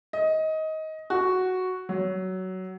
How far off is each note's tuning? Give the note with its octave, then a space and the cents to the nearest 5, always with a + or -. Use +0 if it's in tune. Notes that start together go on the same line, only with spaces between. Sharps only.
D#5 +20
F#4 +0
F#3 +15